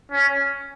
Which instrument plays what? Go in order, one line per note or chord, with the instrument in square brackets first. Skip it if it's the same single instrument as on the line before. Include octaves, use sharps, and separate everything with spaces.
[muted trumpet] C#4